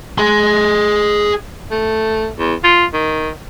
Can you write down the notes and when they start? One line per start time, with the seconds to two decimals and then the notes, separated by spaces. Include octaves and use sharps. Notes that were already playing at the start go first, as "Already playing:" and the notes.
0.18 G#4 C6
1.71 A3
2.38 E2
2.64 F4
2.93 D#3